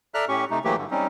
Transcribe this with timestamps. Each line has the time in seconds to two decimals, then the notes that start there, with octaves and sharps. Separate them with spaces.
0.14 A4 D5 E5 A#5 F6 F#6
0.28 A2 C#4 G4 C#6
0.50 C3 A3 D#4
0.64 E3 F#3 A3 A#3 G4
0.77 G2 D3
0.91 G3 C4 C#4 D#4